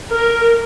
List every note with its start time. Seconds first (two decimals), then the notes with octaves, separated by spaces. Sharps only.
0.14 A#4